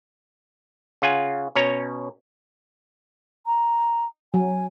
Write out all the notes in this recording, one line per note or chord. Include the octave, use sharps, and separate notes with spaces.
C#3 F4 F#5 G#5
B2 C#4 C#5 A#5
A#5
F#3 G#5